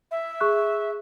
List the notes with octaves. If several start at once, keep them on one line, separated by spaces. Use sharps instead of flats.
E5
G#4 C#6 F#6